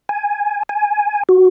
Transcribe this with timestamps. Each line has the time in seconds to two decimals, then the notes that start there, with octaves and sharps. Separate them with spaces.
0.09 G#5
0.69 G#5
1.29 F#4